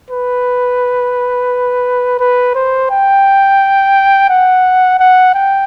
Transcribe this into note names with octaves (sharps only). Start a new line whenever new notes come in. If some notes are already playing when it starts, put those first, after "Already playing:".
B4
B4
C5
G5
F#5
F#5
G5